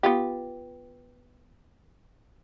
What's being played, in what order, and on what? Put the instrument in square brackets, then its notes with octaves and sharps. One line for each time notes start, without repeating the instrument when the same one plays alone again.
[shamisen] B3 F4 G4